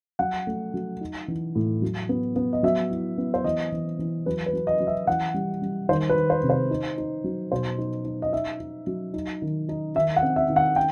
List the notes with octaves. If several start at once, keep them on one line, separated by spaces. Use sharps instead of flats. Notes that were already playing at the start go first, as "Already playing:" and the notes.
F#3 F#5
A3
F#3
D#4
E3
A2
F#3
B3
B3
D#5
F#3 E5
E4
B3
C5
E3 D#5
E3
E3
F#3 B4
B4
F#3
D#5
F#3
E5
E3 F#5
G3
G3
D#3 C5
B4
D#3
C5
C3
C5
D#4
D#4
F#3
B2 C5
D#4
D#4
D#5
D#4 E5
D#4
F#3
D#4
D#3
D#4
D#3 E5
F#5
C4
E5
D#3
F#5
G5